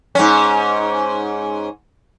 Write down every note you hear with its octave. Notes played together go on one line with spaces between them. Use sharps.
G#2 C#4